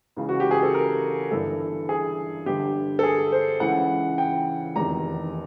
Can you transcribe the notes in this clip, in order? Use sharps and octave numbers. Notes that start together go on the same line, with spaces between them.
C#2 C#3 E3
F#4
G4
G#4
A4
A#4
G1 G2 E3 A4
G#4
G1 G2 D3 G4
A4
G#4
C5
C#2 C#3 E3 F#5
G5
F1 E2 C3 D#3 A#5